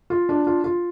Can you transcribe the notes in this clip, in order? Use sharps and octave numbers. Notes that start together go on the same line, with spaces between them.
F4
D4
F4
F4